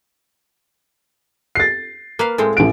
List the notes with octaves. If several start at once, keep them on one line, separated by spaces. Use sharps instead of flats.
A6 C7
A#3 B4 F5
A2 G#3 C4
A1 D7